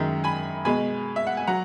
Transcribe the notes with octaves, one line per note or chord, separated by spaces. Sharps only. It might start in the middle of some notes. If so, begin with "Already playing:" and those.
Already playing: F#2 D#3 G#3 E5
G#5 B5
B2 G#3 G#5 B5
E5
F#5
G#5
F#3 F#5 A#5